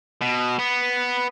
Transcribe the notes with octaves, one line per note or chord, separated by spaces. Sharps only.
B2
B3